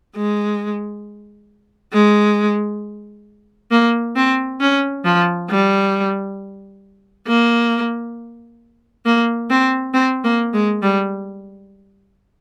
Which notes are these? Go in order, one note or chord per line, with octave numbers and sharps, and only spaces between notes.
G#3
G#3
A#3
C4
C#4
F3
G3
A#3
A#3
C4
C4
A#3
G#3
G3